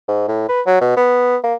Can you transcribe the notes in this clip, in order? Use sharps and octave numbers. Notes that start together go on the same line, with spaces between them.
G#2
A2
B4
F#3
B2
B3
A#3